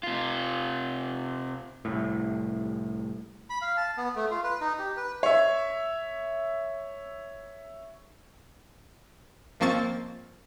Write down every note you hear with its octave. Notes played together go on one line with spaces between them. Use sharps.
C3 F4
C2 A2
B5
F5
A5
B3
A3
F4
B4
D#4
G4
B4
C#5 E5
G#1 F3 A#3 C4 C#6 A6